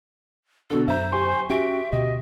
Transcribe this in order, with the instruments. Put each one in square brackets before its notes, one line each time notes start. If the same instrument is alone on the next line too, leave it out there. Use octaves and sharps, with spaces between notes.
[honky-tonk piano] B2 D3 [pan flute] A4
[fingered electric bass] F#2 [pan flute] C5 [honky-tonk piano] E5 A#5
[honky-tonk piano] G4 G#5 C#6 [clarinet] C6
[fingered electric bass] C#4 [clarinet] F#4 [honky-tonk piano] G4 D7 [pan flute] E5
[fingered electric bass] D2 B2 [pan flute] F#4 [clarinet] D#5